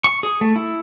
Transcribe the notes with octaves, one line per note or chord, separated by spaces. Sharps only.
C#6
G#4
A3
E4